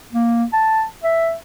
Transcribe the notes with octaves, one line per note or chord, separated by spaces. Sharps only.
A#3
A5
E5